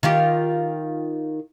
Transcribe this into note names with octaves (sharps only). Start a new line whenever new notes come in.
D#3 F4 G4